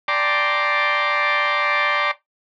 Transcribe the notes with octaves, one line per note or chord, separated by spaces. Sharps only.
D5 G5 A5 A#5 C6 D6